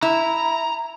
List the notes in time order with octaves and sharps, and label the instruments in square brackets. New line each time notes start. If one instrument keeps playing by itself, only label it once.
[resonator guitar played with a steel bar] E4 [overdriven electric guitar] A#5